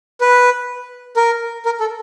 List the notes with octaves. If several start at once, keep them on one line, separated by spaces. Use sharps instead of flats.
B4
A#4
A#4
A4